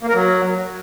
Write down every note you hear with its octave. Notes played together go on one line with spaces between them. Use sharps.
A#3
A#4
F#3